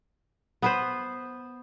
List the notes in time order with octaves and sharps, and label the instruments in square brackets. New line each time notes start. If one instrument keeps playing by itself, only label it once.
[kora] B3 B4 C5